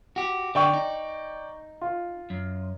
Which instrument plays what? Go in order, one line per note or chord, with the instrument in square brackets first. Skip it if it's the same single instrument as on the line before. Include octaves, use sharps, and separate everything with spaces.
[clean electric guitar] F#4 G4
[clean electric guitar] D3 [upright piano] D5 G5 C#6
[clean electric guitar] D#4
[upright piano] F4
[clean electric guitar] F#2